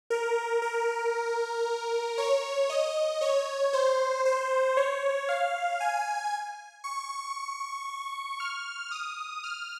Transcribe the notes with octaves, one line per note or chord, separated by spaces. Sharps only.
A#4
A#4
C#5
D#5
C#5
C5
C5
C#5
F5
G#5
C#6
F6
D#6
F6